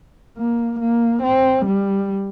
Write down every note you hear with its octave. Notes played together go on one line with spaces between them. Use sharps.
A#3
A#3
C4
G3